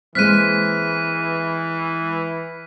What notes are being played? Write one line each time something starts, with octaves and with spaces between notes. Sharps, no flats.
E3 G#3 A#3 C4 F6 F#6 B6 D#7